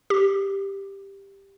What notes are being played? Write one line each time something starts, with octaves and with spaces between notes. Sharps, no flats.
G4